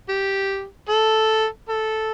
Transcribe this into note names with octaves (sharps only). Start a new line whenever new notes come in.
G4
A4
A4